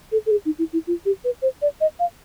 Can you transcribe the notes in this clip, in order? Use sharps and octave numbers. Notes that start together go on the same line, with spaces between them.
A4
A4
G#4
D#4
E4
E4
F4
G4
B4
C5
D5
D#5
F5